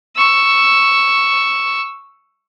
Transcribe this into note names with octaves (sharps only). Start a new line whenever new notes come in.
C#6 E6